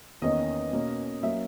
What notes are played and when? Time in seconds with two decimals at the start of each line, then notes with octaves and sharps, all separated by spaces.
0.22 E2 D#3 A#3 C#4 D#5
0.72 B2 A#3 C#4
1.23 F#3 A#3 C#4 E5